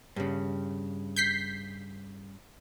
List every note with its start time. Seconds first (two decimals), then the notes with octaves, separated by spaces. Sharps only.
0.16 G2 C#3
1.16 G6 B6 C7